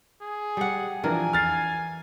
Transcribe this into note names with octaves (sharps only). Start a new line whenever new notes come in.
G#4
G3 F#5
E3 F3 D4 A#4 G#5
F6 A6 C7